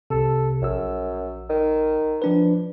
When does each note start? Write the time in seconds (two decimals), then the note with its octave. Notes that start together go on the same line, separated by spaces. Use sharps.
0.10 C2 C3 A4
0.62 A#1 F#2 E6
1.49 D#3
2.22 F3 D4 B4